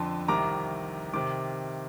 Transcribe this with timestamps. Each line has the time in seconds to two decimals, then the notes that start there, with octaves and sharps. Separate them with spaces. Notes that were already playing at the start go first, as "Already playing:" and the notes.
Already playing: F2 D3 A5 C6
0.28 C2 C3 D#3 A#5 D6
1.13 C3 D#3 D6